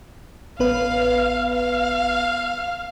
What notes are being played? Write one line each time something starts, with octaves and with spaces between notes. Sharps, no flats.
A1 B3 B4 F5
F5